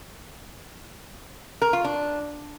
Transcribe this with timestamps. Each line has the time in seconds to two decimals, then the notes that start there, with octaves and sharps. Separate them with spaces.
1.62 A#4
1.73 F4
1.84 D4